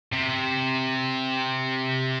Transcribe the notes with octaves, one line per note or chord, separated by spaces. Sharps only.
C3